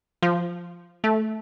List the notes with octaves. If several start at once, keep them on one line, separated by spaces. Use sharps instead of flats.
F3
A3